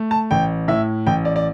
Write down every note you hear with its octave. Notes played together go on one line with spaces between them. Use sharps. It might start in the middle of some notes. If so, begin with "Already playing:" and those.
Already playing: A3
A5
A1 G5
A2 E5
A1 G5
D5
D5